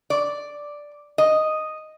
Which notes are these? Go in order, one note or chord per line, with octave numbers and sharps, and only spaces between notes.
D5
D#5